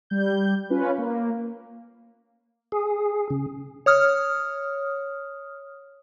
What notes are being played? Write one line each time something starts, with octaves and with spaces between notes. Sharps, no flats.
G3 G6
C#4 F4 B4
A#3
G#4
C#3
C#5 D#6 F6